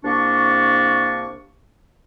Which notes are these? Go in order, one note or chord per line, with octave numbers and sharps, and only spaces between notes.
C2 A#3 D4 C#6